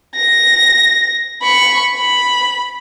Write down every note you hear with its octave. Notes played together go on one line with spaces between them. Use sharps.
A#6
B5 C#6
B5